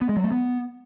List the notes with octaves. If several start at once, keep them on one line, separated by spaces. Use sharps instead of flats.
B3
G#3
F#3
A3
B3